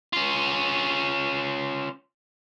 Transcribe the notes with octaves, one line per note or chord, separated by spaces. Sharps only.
C#4 F4